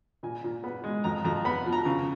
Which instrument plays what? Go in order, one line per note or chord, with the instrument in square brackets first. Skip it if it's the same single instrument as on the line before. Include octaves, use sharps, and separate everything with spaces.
[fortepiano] A#2 G#5
A#2
B3
G#3
F2 A#5
F2 A#5
B3 B5
F3
A#5
C#3